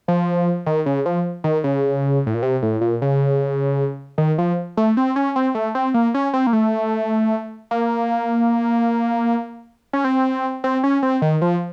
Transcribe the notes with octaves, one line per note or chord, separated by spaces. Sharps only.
F3
D#3
C#3
F3
D#3
C#3
A2
A#2
C3
A2
A#2
C#3
D#3
F3
A3
C4
C#4
C4
A3
C4
A#3
C#4
C4
A#3
A3
A#3
C#4
C4
C4
C#4
C4
D#3
F3